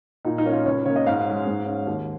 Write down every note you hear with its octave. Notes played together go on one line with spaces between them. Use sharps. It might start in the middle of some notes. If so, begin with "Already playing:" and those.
A#2 D#4
D#4
A#3 C#4
F4
C#2 C#5
C#3 A#3 C#5
D#5
G#2 F5
G#3 C#4
G#2
G#3 C#4
D#2